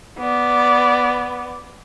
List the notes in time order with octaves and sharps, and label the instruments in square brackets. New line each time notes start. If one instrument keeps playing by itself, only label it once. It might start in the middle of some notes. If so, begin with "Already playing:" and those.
[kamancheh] B3 D5